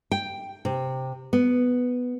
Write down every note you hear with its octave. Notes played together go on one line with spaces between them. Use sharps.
G5
C3
B3